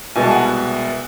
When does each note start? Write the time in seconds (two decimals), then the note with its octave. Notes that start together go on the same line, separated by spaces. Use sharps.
0.16 C2 B2 G#3 B3 G#5
0.24 A5
0.31 F#5 G#5